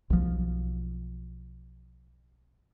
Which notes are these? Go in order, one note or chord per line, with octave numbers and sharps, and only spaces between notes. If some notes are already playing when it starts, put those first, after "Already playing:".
B1 F3